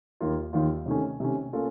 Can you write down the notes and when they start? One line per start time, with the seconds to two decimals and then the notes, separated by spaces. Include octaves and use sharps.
0.20 D#2 D#3 A#3 F4
0.53 D#2 D#3 A#3 F4
0.86 C3 D#3 A3 C#4
1.20 C3 D#3 A3 C#4
1.53 A#3 C#4 F4 A4